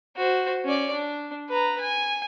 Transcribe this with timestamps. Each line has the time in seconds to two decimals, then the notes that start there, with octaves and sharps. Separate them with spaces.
0.17 F#4 C5
0.65 C#4 D5
0.94 D4
1.49 B4 A#5
1.80 G#5